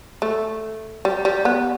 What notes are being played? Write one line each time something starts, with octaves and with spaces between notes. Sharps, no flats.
A3
G3
G3
B3